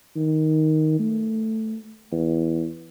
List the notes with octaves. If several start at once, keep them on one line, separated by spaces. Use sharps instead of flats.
D#3
A3
E2